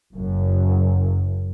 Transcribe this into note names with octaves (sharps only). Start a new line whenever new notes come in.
F#1 F#2